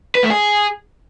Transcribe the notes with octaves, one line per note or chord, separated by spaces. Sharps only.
B4
A3
G#4